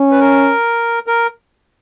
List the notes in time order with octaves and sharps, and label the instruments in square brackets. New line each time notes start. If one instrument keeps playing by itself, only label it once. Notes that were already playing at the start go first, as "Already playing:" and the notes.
Already playing: [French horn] C#4
[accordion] B4
A#4
A#4